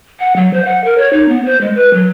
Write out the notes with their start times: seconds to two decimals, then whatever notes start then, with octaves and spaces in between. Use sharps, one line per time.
0.20 F#5
0.36 F#3
0.53 C5
0.65 F#5
0.84 A#4
0.98 C#5
1.13 D#4
1.29 B3
1.45 C5
1.61 G#3
1.75 B4
1.94 F#3